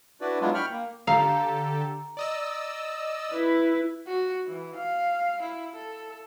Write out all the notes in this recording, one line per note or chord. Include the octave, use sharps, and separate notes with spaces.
D4 E4 F#4 B4 D5
F#3 G#3 B3 D4 E4 F4
G5 B5 C#6 F6
A#3
D3 G4 A4 F5 A#5
D5 D#5 E6
E4 B4
F#4
E3
F5
E4
A4